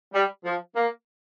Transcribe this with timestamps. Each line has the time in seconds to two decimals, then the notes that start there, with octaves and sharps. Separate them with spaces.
0.14 G3
0.45 F3
0.76 A#3